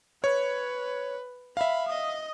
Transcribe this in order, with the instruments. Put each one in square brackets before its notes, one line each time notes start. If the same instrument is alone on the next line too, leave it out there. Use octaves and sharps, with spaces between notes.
[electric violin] B4 [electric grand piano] C#5
[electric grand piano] E5 F5 [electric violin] B5
[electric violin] D#5 D#6